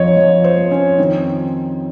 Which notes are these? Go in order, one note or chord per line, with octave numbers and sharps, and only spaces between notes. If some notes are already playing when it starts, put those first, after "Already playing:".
Already playing: F2 F3 C#5 D#5
F3
C5
F2
C#4
D#3 C4